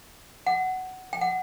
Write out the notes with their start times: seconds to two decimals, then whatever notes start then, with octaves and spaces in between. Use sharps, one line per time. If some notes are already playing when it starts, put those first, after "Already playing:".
0.47 F#5
1.13 G5
1.21 F#5